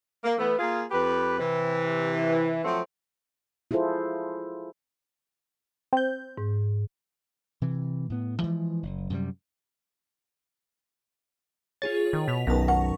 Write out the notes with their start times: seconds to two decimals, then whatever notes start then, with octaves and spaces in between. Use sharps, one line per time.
0.24 A#3
0.39 E3 A3 B3
0.59 A#3 F4 G#4
0.91 F2 G4 B4
1.39 C3 E3
2.65 F3 F#3 A3 C4
3.71 E4 F4 G#4 A4 C5
5.93 C4 G6
6.38 G#2
7.62 C3 E3
8.10 A2 B3
8.40 E3 F3 G#3
8.83 F#1
9.10 F#2 C3 D#3 G3
11.82 F4 G#4 C#5 A6
12.13 D#3
12.28 B2 B6 F7
12.47 B1 F#2 D#3 B3 B4 A5 A#6
12.68 A#4 F#5 C#6